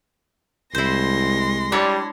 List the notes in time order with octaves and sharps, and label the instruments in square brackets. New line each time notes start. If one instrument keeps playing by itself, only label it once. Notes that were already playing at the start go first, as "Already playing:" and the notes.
[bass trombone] C2 [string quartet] G#3 C6 A#6 [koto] E4 C5
[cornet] G3 [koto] D4 E4 C#5